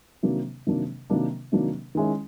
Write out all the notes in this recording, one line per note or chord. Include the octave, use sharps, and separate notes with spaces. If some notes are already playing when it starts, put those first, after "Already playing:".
C3 D#3 F#3 A#3 D4
C3 D#3 F#3 A#3 D4
C3 D#3 F#3 A#3 D4
C3 D#3 F#3 A#3 D4
D#3 G#3 C#4 E4